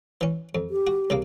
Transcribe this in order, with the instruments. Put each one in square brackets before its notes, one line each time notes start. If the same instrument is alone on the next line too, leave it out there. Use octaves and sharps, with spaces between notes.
[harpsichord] E3 C#4
F2
[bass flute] G4
[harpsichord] F#4
C2 C#3 A#3